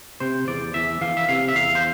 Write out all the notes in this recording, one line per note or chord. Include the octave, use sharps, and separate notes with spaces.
C3 C5
E2 D5
E2 E5
E3 F5
E5
C3 F5
E5
E2 F5
C5